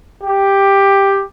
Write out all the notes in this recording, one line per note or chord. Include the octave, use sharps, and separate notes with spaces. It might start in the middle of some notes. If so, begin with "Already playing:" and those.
G4